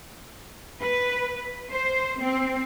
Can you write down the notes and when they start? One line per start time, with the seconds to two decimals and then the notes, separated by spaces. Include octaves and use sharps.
0.80 B4
1.72 C5
2.21 C4